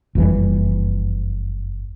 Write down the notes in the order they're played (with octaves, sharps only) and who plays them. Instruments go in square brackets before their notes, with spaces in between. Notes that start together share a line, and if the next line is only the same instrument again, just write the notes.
[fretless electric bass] F#1 F2 E3 G3